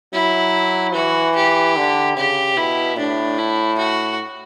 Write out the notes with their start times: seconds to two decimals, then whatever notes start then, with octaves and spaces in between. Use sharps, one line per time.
0.13 F#3 E4
0.94 E3 F#4
1.36 G4
1.76 D3
2.16 C#3 G4
2.57 B2 E4
2.98 A2 D4
3.38 E4
3.79 F#4